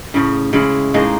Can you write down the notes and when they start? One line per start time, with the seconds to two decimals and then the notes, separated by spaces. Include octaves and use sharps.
0.14 A2 C#3
0.53 C#3 G#3 E4
0.94 A2 G#3 A#3 D#4